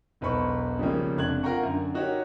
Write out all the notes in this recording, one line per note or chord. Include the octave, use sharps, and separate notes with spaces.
E1 B1 B4 C5 B5 C#6
C#3 F3 G3 G#3 A#3 C#4
F1 D4 F#6 G#6 F#7
F4 A#4 F#5 G5 A#5 C#6
F#2 D3
D#4 F#4 G4 A#4 C#5